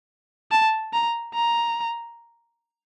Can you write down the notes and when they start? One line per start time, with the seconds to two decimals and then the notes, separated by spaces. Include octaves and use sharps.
0.51 A5
0.93 A#5
1.34 A#5